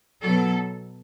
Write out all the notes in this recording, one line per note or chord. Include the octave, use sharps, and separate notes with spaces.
B2 F#3 A4